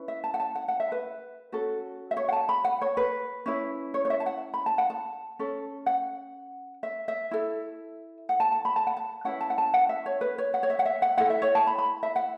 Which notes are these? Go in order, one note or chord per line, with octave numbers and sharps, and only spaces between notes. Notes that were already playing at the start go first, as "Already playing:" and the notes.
Already playing: C#4 E4 B4
E5
A5
F#5
A5
F#5
F#5
E5
B4
C#4 F#4 A4
E5
C#5
F#5
A5
B5
F#5
C#5
B4
C#4 E4 B4
C#5
C#5
E5
A5
F#5
B5
A5
F#5
A5
C#4 A4
F#5
E5
E5
E4 A4
F#5
A5
A5
B5
A5
F#5
A5
C#4 E4 B4 F#5
A5
F#5
A5
F#5
E5
C#5
B4
C#5
F#5
C#5
E5
F#5
E5
F#5
E4 A4 F#5
E5
C#5
A5
B5
B5
E5
F#5